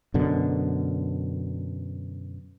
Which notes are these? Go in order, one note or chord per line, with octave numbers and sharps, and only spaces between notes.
F#2 B2 D3